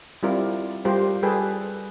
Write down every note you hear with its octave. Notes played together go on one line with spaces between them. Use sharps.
G3 C4 E4 F4 A#4 D5
G3 F4 G4 A#4 C5
G3 G#4 A4 B4 G5 A5